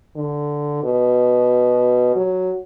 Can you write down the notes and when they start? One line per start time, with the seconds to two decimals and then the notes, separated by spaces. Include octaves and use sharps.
0.16 D3
0.83 B2
2.16 F#3